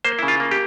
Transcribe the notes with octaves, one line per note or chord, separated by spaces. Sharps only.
A#3 C5
C#3 E4
F4
A#3
G4